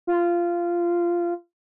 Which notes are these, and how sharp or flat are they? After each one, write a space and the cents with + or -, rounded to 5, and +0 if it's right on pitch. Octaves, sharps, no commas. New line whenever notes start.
F4 -15